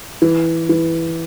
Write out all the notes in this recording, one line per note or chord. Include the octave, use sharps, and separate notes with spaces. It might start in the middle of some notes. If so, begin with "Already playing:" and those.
E3
E3